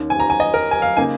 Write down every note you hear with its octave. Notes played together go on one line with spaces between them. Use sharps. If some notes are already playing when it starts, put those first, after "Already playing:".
Already playing: D#2 D#3 C#4
G#5
A#5
G#5
D#5
A#4
G#5
F5
C#3 A#3 D#4 G#5